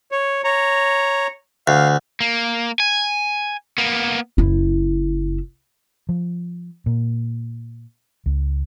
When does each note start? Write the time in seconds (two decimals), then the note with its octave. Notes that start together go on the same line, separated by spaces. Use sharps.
0.12 C#5
0.44 C#5 A#5
1.68 D2 F5
2.21 A#3
2.80 G#5
3.78 A#3 B3
4.38 F#1 E4
6.09 F3
6.86 A#2
8.26 C#2